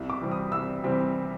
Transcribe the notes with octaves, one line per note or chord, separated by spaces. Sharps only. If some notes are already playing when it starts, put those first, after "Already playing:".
Already playing: C2
D6
C3 E3 G3 C4
D#6
C2 E6
C3 E3 G3 C4